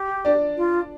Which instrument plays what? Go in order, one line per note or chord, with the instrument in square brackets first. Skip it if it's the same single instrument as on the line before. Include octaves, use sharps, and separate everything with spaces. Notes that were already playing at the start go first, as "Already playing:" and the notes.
Already playing: [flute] G4
[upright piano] D4 D5
[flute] F4